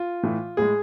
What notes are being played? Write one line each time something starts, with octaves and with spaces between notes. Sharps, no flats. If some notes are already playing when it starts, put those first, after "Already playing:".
Already playing: F4
A2 E3 A3
A2 G#3 G#4